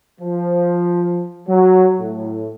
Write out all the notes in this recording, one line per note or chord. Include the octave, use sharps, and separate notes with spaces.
F3
F#3
A2